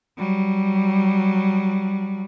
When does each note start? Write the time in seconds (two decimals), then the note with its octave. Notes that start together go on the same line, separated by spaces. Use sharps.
0.18 F#3 G3